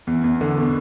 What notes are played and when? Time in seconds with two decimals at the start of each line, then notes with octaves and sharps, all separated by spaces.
0.07 E2
0.24 E2
0.41 D3
0.58 B2